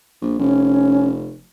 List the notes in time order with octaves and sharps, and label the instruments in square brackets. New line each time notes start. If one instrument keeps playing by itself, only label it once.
[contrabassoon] A#1
[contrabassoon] F1 [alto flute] C#4